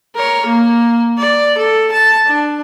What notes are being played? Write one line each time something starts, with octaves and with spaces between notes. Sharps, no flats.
A#4 C#5
A#3
D5
A4
A5
D4